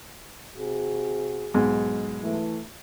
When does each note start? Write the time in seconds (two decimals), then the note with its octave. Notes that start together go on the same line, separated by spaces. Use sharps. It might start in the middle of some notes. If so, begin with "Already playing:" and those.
0.57 C3 F#4 G#4
1.54 B1 G#2 G#3
2.21 E3 A3